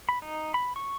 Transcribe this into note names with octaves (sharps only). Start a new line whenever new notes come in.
B5
D#4
B5
C#6